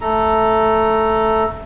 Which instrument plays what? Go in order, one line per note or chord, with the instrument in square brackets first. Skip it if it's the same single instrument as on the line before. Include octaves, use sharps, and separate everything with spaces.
[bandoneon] A3 A4 A#5